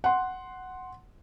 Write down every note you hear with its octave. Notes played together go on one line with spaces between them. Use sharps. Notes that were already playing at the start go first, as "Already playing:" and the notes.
F#5 C6